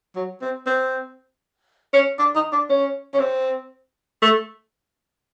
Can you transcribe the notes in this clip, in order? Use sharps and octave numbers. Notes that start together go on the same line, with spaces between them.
F#3
C4
C4
C#4
D4
D#4
D4
C#4
C#4
C4
A3